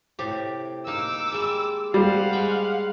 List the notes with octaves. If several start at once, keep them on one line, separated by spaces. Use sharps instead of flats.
A2 C3 G4
A#3 D#4 D6 E6
G3 G#3
G3 C5 F5 F#5
G#3 G5